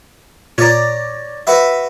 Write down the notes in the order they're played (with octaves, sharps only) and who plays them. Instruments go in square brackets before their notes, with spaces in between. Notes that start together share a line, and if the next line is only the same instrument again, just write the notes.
[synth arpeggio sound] A#2 [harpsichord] C#5 D5 A#5
[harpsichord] F#4 B4 E5